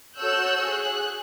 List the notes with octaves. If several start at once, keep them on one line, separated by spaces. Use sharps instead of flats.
F#4 A4 C#5 E6 F#6 G6
G#4 F#6